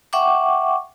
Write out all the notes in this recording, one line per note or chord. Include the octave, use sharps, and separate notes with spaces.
E5 F#5 G5 C#6 D6